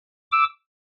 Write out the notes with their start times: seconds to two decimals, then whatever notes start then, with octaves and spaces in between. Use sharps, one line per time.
0.32 D6 E6